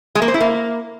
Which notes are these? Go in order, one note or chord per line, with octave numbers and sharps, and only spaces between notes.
G#3
A#3
C5
E4
A#3